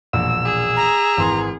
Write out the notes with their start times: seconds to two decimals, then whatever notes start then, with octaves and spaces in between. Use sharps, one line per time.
0.13 E1 A#1 E6
0.45 G#4
0.76 A#5
1.17 G#1 E3 C6